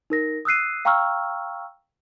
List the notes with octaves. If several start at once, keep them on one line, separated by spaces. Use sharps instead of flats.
D#4 A#4 A#6
D#6 E6 F#6 C7 D#7
F5 G5 A#5 C#6 E6 F6